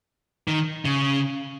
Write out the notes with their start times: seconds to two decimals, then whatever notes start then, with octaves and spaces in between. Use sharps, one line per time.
0.48 D#3
0.85 C#3